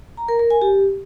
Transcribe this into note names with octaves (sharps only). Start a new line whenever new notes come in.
A#5
A#4
A#4
G#5
G4